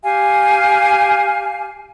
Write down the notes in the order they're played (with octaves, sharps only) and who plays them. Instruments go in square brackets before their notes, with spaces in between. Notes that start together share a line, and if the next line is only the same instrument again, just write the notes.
[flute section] G4 F5 G#5